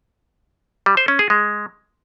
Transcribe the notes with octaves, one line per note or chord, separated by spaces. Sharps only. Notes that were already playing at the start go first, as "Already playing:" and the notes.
G3
C5
C#4
G#4
G#3